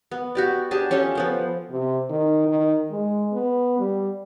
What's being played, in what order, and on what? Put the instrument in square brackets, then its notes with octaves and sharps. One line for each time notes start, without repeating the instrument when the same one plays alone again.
[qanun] B3
F#4 G4 D5
D4 G4 G#4 A5
C#4 F4 G4 A4
F3 B3 C5
[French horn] C3
D#3
D#3
G#3
B3
G3